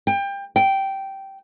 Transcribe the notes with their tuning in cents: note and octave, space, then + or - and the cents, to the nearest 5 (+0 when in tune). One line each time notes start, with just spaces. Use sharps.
G5 +25
G5 -10